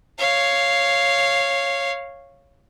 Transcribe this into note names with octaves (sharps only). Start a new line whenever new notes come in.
C#5 F5